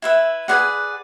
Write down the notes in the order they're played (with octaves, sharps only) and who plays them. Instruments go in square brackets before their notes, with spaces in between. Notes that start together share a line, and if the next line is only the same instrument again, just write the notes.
[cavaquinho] E4 B4 E5
G#4 B4 D5 F#5